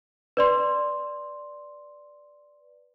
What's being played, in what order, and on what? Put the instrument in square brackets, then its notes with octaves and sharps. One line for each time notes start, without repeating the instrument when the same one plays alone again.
[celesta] B4 D5 C6